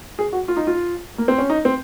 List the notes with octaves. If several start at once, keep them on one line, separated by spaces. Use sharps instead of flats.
G#4
F#4
F4
D#4
F4
A#3
C4
C#4
D#4
C4